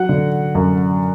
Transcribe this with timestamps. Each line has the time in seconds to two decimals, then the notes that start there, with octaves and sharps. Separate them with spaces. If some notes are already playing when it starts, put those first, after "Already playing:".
Already playing: F#3 F#5
0.09 D3
0.55 F#2